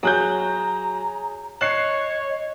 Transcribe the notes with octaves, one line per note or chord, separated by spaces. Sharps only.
F#3 G#4 A#5 F#6 G6
C#5 D#5 A5 F#6 C7